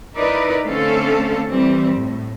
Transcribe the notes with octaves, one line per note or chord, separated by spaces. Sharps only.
D#4 E4 A#4 B4 D5
D3 A3 C4 C#4 A4 F5
E3 G3 C4
A2